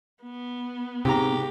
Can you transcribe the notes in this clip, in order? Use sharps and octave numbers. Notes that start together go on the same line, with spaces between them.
B3
G#2 C3 G4 A#5